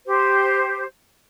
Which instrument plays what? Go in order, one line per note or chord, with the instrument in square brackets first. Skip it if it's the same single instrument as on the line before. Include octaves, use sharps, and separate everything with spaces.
[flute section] G4 C5